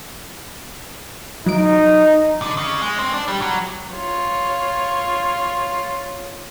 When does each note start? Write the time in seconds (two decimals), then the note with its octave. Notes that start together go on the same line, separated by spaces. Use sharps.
1.46 F#3 D#4 D#5 D7
2.42 D3
2.57 C#3
2.82 G#3
2.99 C4
3.13 D4
3.28 G3
3.42 F#3
3.93 F4 C#5